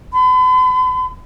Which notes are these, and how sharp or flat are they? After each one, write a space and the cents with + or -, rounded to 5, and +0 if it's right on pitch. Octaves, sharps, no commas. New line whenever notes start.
B5 +45